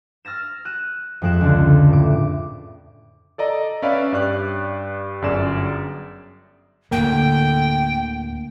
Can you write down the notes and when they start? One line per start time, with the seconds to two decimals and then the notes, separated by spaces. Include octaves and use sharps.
0.25 E6 F6 A6 A#6 E7
0.65 F#6 D#7 E7
1.22 F2 G#3 F4 F#6 D7 E7
1.41 C#2 D3
1.91 A2 D6
3.38 A4 D5 D#5 A#5
3.82 C#4 B4 D5 E5 F5 B5
4.12 G2 D5 F#6
5.22 G1 F#2 G#4 D5 E7
6.91 D2 A2 D3 A#3 G5